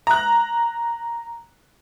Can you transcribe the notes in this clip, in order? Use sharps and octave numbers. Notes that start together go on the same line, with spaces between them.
A#5 F#6